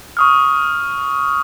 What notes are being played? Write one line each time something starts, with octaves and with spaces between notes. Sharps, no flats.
C#6 D#6 F6